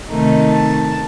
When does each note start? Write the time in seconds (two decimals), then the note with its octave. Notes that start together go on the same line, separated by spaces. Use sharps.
0.10 C3 D#3 A3 D#4
0.52 A5